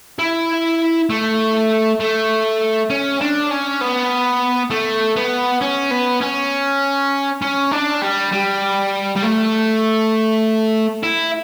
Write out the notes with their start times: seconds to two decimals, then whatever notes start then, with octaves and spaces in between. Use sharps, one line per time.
0.19 E4
1.10 A3
2.00 A3
2.90 C#4
3.21 D4
3.50 C#4
3.81 B3
4.70 A3
5.16 B3
5.61 C#4
5.91 B3
6.21 C#4
7.42 C#4
7.71 D4
8.02 G3
8.32 G3
9.16 G3
9.23 A3
11.03 E4